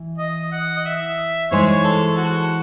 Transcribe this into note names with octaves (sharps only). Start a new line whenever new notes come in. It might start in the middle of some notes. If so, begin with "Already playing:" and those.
Already playing: E3
D#5
F#5
D#5
E5
E3 G#3 D#4 G#4 C5 C#5
A4
F#4